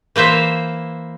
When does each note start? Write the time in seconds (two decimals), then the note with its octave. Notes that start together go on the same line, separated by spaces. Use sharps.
0.16 E3 A#3 C5 E5